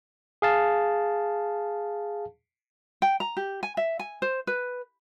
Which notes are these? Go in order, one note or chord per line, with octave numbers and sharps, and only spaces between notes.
G#4 F5 A5
G5
A#5
G4
G#5
E5
G#5
C5
B4